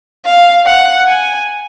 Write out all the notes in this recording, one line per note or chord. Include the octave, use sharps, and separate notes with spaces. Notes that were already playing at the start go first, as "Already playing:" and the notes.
F5
F#5
G#5